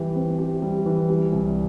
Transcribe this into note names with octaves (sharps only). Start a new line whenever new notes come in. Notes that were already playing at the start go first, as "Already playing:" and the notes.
Already playing: E3 G3 G4
C4
G4
G3
E3
G3
C2